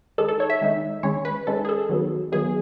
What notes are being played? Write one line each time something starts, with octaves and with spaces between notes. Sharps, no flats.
D#3 G#3 D#4 A4
A4
C#5
E5
D#3 G#3 D#4
D#3 G#3 C#4 C#5
B4
D#3 G#3 C#4 A4
G#4
A4
D#3 F#3 B3
D#3 F#3 B3 G#4